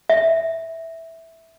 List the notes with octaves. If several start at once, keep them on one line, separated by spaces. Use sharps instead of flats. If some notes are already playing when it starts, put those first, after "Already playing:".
E5